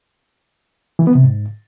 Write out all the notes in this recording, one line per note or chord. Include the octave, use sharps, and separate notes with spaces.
E3
B3
C3
G#2